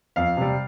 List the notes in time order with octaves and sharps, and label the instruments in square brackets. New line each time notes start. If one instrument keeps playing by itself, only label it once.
[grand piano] F2 F5
C3 G3